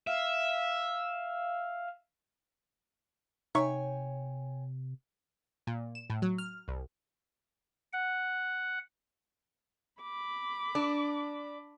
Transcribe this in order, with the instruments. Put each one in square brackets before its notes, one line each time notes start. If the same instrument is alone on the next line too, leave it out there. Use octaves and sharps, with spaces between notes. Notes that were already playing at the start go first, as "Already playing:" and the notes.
[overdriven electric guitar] E5 [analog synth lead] F5
[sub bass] C3 [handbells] D#4 E5 C#6 [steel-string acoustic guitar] C#5 G5 G#5
[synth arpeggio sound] A#2
E7
A2
F#3
F6
C2
[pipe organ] F#5
[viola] B5 D6
[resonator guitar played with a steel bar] D4